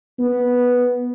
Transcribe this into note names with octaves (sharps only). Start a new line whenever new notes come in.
B3